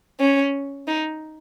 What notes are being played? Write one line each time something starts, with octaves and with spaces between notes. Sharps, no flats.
C#4
D#4